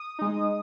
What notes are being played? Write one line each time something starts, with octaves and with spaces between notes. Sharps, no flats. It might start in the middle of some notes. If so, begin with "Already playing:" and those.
Already playing: D#6
G#3 D#4